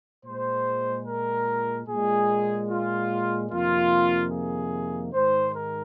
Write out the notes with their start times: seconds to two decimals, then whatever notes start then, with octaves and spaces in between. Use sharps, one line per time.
0.24 A#2 G#3 C5
1.06 A#4
1.87 A#2 G#3 G#4
2.69 F4
3.50 F2 C3 D#3 A#3 F4
4.31 G#4
5.13 G#2 D#3 G#3 C5
5.53 A#4